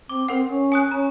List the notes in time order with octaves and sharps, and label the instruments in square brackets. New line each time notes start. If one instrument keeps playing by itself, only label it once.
[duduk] C4 [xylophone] D6
[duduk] C4 [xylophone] A#4 F#5
[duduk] C#4
[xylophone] G#5 D#6 F#6
[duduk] C#4 [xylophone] A#5